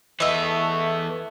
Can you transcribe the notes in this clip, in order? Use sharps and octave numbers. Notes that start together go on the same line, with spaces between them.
E3 A3 B3 D#5 E5